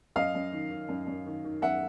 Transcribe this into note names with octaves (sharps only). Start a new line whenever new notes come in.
F#2 D#5 F5
F#2
D#3
D#3
F#2
F#2
D#3
D#3
F#2 E5 F#5